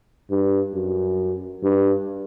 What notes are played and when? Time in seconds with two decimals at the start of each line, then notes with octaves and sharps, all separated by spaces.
0.30 G2
0.74 F#2
1.63 G2